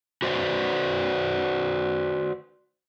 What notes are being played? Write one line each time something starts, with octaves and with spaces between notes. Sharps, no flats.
F#4 B4 C5 D5